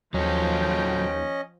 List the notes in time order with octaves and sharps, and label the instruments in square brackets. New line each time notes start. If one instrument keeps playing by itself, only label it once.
[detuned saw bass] D#2 [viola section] F3 G5 [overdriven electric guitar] F#3 A4 [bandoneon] C#4 D#5